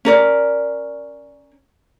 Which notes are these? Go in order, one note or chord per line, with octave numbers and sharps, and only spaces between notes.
C#4 A#4 D5